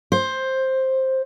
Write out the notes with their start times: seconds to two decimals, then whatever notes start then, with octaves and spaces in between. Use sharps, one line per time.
0.12 C5